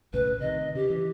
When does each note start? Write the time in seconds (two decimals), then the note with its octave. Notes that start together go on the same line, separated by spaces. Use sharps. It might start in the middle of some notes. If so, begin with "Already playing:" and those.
0.13 B1 A2 C#3 B4
0.40 C3 D#3 D#5
0.75 C#3 G4
0.90 E3